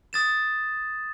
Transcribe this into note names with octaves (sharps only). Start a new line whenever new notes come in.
D#6 A6 E7